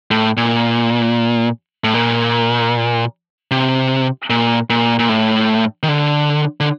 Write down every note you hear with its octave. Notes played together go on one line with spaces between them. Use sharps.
A2
A#2
A2
A#2
C3
A#2
A#2
A#2
A2
D#3
D3
D3